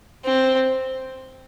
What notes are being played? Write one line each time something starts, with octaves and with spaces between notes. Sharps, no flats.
C4